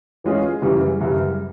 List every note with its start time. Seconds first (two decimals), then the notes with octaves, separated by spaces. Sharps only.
0.24 E3 G#3 C#4 F4 G#4
0.62 F#2 C#3 E3 G3
1.00 F#2 C#3 E3 G3